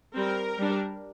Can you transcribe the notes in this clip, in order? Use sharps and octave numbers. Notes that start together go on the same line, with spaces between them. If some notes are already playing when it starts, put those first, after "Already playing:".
G3 C4 A#4
G3 D4